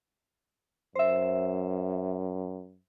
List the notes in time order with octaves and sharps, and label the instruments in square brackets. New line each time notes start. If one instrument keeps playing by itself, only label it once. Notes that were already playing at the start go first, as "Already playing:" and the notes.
[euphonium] F#2 [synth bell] C5 E5